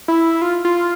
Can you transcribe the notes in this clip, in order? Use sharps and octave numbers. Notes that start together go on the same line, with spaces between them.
E4
F4
F4